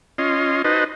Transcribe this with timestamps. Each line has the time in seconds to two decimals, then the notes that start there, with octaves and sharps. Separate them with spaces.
0.18 C#4 F4 D#5 C6
0.65 D#4 F#4 B4 C5 D#5 A5